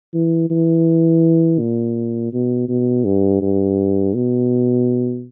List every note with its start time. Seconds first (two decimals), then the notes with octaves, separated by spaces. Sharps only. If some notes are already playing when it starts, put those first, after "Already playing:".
0.14 E3
0.50 E3
1.59 A#2
2.33 B2
2.68 B2
3.05 G2
3.42 G2
4.15 B2